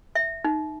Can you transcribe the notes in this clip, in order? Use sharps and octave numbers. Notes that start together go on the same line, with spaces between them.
E5
D#4